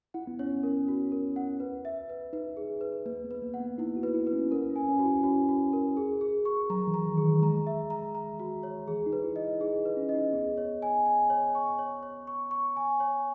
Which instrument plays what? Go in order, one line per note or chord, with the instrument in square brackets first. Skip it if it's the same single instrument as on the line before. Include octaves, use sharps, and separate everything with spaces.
[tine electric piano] E4 [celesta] F#5
[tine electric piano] B3
[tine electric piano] C#4 [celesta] C#5
[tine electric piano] C#4 [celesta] A#4
[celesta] F#4
A#4
F#5
B4
E5
B4
[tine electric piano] D#4 [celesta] B4
[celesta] G#4
B4
[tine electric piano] A#3 [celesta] B4
[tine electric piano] B3
[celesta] B4
[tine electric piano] A#3
[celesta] F#5
[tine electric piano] B3
[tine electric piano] D#4 [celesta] E4
[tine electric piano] F#4
[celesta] B4
[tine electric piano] E4
[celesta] B4
[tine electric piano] C#4
[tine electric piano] C#4 [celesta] A#4
[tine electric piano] C#4
[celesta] G#5
[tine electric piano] C#4
[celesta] F#4
[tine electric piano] E4
[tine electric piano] C#4 [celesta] F#4
[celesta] F#4
A#4
G#4
G#4
C#6
[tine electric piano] F#3 [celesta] A#5
[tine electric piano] E3
[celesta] A#5
[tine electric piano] D#3
[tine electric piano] D#3 [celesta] G#4
[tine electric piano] E3
[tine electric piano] G#3 [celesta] A#5
[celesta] E5
A#5
A#5
F#4
C#5
[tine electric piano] E3 [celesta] G#4
[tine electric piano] D#4
[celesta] B4
[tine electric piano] E4
[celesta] D#5
[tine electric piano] D#4 [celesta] G#4
[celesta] B4
[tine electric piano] C#4
[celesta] D#5
[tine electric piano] D#4
[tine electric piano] B3 [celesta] G#4
[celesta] C#5
G#5
G#5
C#5
C#6
C#5
C#5
C#6
C#6
G#5
C#5